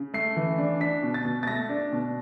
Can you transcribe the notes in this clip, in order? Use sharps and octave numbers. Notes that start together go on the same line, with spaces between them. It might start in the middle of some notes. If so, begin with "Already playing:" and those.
Already playing: C#3
A3 C7
E3
D4
D4 B6
B2
A6
B2
A6
A3 A#6
D4
B2